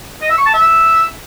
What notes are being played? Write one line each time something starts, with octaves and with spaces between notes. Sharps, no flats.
D#5
E5
C#6
A5
E5